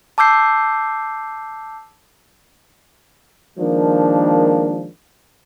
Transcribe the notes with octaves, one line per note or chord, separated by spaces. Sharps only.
A5 D6 E6 G6 C7
D#3 F3 G#3 A#3 D4